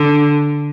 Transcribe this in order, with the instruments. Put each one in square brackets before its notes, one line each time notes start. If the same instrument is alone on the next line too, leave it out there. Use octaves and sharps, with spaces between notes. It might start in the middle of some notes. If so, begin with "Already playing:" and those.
Already playing: [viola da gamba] D3